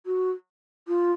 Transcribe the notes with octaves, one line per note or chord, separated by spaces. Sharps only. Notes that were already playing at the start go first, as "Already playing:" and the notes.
F#4
F4